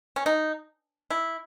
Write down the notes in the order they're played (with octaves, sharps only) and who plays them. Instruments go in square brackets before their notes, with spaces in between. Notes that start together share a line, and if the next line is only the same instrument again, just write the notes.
[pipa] C#4
D#4
E4